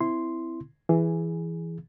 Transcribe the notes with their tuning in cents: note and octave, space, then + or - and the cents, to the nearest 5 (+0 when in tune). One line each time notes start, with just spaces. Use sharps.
C4 -25 E4 +0 C6 -5
E3 +5 G#4 +0